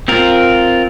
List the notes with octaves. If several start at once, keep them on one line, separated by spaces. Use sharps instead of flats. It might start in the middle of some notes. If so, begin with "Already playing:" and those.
C4 F4 A#4